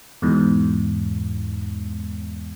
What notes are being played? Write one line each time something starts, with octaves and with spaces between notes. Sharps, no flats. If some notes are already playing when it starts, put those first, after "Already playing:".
E2 G#2 B2